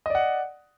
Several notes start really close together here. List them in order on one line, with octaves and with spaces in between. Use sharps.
D#5 D5 F#5